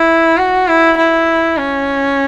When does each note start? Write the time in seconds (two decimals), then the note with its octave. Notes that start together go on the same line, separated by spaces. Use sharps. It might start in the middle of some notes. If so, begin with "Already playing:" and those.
Already playing: E4
0.37 F#4
0.67 E4
0.98 E4
1.57 C#4